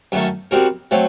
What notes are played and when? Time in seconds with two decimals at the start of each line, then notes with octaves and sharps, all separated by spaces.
0.12 F#2 D#3 A3
0.51 G3 C4 F#4 A#4
0.91 F#3 A3 C4